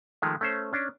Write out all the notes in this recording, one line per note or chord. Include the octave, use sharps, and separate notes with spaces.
D#3 F3 G#3 A3
A3 C#4 C5
C#4 D4